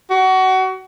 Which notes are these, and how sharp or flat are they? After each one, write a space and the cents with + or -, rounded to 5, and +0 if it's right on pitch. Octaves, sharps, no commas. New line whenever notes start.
F#4 +25